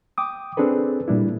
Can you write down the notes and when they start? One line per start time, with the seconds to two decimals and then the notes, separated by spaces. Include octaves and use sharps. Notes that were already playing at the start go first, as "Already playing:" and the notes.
0.18 G5 D6 D#6
0.57 C4 D4 G#4 A4 B4
1.08 A#2 G3 D4 E4